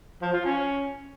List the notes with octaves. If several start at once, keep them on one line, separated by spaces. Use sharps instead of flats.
F3
F4
C#4